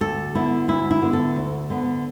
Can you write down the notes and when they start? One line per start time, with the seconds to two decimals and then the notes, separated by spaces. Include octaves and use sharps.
0.01 D2 A4
0.35 D3 B3 E4
0.68 D2 E4
0.91 E4
1.02 D3 B3
1.13 A4
1.36 D2
1.70 D3 B3